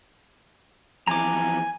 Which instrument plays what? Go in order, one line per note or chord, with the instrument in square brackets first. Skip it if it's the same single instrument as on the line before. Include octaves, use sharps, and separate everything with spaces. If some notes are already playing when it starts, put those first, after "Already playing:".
[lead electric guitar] F2 E3 [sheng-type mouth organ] G#5 [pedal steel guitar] A#5 D6